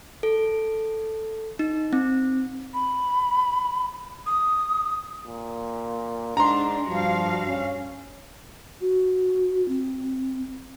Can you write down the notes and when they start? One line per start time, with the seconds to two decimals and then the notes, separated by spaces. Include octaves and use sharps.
0.23 A4
1.59 D#4
1.93 C4
2.74 B5
4.26 D#6
5.27 A#2
6.37 G#2 D4 A#5 C6
6.89 G2 F3 F#4 F5
7.48 C#4
8.81 F#4
9.68 C4